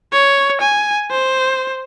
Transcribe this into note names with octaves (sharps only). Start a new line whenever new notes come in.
C#5
G#5
C5